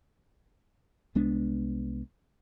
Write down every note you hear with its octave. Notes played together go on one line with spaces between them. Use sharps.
C2 G#3 B3 D4